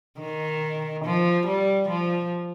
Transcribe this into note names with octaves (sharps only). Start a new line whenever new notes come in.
D#3
F3
G3
F3